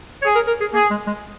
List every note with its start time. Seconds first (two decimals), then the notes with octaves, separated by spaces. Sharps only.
0.22 G#4 C#5
0.35 A#4
0.48 A#4
0.61 G#4
0.73 A#3 G#4
0.90 G#3
1.07 G#3